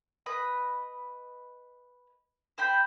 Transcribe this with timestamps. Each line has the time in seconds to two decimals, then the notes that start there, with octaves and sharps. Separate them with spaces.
0.26 B4 D#5 B5
2.58 C5 G5 B5